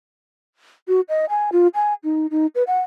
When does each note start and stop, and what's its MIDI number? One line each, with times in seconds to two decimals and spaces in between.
0.88 1.01 66
1.09 1.25 75
1.29 1.50 80
1.52 1.67 65
1.74 1.94 80
2.04 2.26 63
2.31 2.47 63
2.55 2.63 71
2.67 2.80 78